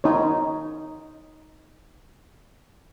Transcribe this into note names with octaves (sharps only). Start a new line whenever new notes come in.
D#4 C#5